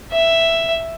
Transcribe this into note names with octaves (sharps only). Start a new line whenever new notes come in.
E5